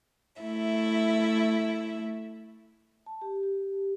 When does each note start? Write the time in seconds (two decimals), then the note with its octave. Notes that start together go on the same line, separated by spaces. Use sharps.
0.41 A3 E4 E5
3.06 A5
3.22 G4
3.43 G4